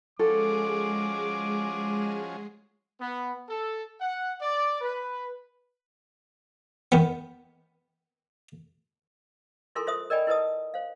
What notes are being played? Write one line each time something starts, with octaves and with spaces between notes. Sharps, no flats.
F3 G#3 C#4 F#4 G#4 A4 D6
B3
A4
F#5
D5
B4
D#3 B3
E4 F4 A4 A#4 G#5 C6
F4 C5 E5 D#6
A#4 D5 D#5 G5 G#5 B5
E4 A#4 B4 D#5 A5 D#6
C5 F5